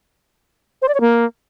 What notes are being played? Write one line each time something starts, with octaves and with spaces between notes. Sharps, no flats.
C5
D5
C#5
A#3